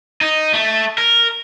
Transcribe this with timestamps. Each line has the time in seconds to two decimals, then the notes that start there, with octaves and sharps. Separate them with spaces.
0.21 D#4
0.53 A3
0.98 A#4